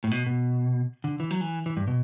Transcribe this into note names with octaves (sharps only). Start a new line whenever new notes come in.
A2
B2
B2
D3
E3
F#3
E3
E3
G2
B2